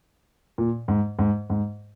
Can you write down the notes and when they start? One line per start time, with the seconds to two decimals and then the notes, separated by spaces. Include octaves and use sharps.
0.58 A#2
0.88 G#2
1.19 G#2
1.50 G#2